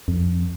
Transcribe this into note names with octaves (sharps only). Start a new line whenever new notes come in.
F2